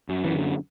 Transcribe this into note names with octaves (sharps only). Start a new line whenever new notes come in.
F#2
E3
D3